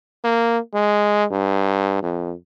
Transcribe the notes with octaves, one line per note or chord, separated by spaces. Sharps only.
A#3
G#3
G2
F2